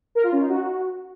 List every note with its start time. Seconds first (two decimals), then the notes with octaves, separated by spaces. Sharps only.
0.15 A#4
0.24 F4
0.32 C#4
0.40 D#4
0.49 F#4